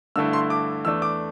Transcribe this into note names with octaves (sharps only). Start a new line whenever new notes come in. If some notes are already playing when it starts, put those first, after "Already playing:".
G2 D3 A3 E4 E6
C6
D6
E2 E3 A3 D4 E6
D6